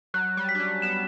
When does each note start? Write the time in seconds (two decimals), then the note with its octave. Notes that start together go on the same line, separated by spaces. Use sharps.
0.14 F#3 F#6
0.37 G3
0.49 B6
0.55 D4
0.60 C#4
0.82 B3 E7